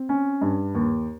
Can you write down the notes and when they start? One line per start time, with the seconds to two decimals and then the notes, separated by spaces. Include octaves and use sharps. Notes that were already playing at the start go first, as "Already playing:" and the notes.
Already playing: C4
0.09 C#4
0.41 G2
0.75 D#2